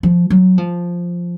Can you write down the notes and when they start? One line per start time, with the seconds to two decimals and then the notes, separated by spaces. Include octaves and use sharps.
0.03 F3
0.30 F#3
0.58 F3